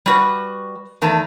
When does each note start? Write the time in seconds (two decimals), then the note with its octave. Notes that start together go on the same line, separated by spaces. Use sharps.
0.06 G3 F#4 B4
1.02 E2 D#3 A3 A5 A#5